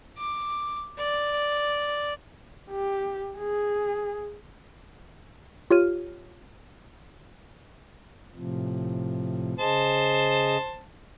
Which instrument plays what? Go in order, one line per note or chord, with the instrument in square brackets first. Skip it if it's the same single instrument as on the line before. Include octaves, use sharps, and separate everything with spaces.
[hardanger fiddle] D6
D5
[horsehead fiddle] G4
G#4
[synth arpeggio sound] F4 G4 C#5 F6 D#7
[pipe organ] A2 C3 F3
[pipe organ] C#3 G#4 D#5 [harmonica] C5 A5